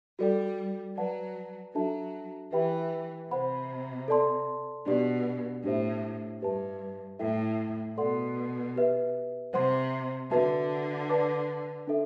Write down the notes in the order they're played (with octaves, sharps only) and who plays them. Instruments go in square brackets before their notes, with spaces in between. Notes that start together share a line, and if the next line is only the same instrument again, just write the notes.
[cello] G3 [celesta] F#4 A4 D5 G5
[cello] F#3 [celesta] B4 D5 F#5 A5
[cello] F#3 [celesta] D4 F#4 A4 E5 A5
[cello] E3 [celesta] G4 B4 E5 G5 B5
[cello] C3 [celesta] C5 F#5 B5
[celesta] A4 D5 A5 C6
[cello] B2 [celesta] D4 G4 D5
[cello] A2 [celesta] D4 G4 C5 E5
[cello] G2 [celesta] G4 B4 E5 A5
[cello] A2 [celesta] E4 A4 E5 G5
[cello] B2 [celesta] A4 D5 F#5 C6
[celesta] G4 B4 E5
[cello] C3 [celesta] C5 F#5 C6
[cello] D3 [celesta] F#4 B4 E5 A5
[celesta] B4 D5 A5 D6
D4 A4 E5